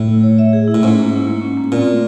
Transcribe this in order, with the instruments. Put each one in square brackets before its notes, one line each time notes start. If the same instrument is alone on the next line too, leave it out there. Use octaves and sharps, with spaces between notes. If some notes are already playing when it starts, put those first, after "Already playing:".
Already playing: [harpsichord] A2
[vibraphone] E4
C#5
E5
G#4
E4
[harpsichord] A2
[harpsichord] G#2 [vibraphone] C#4
[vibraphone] A#3
E4
A#3
C#4
A#3
[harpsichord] A#2 [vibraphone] C4
[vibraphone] A3